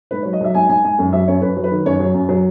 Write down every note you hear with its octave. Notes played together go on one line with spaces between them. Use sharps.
G#2 B4
F#3 C#5
D#5
F#3 E5
G#2 G#5
G#2 G#5
G#2 G#5
F#2
F#3 E5
F#2 C#5
F#2 B4
F#3
B4
D#3
F#2 C#5
F#3
F#2
F#3